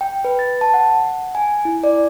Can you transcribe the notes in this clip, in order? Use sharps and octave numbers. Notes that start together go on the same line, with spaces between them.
G5
B4
A6
A5
F#5
G#5
E4
D5